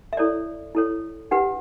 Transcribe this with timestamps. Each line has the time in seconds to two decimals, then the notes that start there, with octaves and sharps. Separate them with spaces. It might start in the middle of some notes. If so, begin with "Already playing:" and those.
0.13 E5
0.17 E4 A4 C#5 D5
0.75 E4 A4 C#5
1.31 D4 G4 B4 F#5